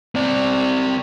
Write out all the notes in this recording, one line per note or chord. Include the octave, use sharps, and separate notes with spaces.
C4 D5